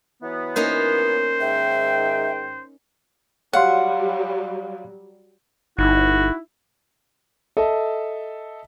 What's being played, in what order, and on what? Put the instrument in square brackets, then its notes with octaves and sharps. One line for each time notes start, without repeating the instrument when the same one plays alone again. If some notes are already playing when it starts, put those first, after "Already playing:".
[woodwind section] E3 F#3 B3
[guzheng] A#3 C#4 D#4 [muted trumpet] C5
[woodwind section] G#2 D#3 G5 [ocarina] E5
[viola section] F#3 G3 [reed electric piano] C#5 F5 C6 [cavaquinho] F#5
[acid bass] G1 [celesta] D#4 [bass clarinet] E4 [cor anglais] F#4
[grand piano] A4 D#5 E5